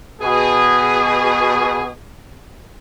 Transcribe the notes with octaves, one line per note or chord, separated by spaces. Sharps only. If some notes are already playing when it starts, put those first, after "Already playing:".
B2 G#4